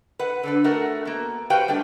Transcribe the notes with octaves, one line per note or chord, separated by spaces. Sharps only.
B4 F#5
D3 D4 B4
A3 F#4 A#4 F#5
A#3 B3
F#4 G4 B4 C5 F5 G5
G3 A3 D4 G4